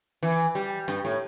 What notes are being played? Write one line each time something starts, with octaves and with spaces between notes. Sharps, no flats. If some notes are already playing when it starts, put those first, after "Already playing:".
E3
G3
G2
A2